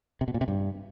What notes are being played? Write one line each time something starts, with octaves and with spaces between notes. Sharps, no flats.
C3
B2
A#2
C3
G2